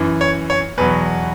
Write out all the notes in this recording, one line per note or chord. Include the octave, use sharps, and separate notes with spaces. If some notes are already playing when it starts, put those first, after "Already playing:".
Already playing: F#2 E3
C#5
C#5
E2 B2 F#3 B4